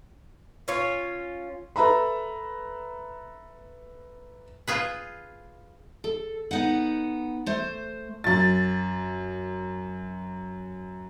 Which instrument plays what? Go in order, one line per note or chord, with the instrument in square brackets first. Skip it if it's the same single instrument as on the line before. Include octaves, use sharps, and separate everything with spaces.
[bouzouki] C#4 F4 C#5
[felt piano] A4 B4 E5 A#5 B5
[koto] F4 G#4 B4
[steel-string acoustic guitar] A4
B3 D#4 F#5
A3 C5
[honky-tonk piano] F#2 A6